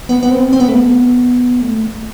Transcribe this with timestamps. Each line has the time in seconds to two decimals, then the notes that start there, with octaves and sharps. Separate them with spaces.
0.09 B3
0.23 B3
0.31 C4
0.53 C4
0.60 B3
0.68 A3
0.75 B3
1.61 A3